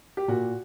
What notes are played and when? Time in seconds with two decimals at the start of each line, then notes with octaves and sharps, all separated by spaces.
0.17 G4
0.28 A#2 F#4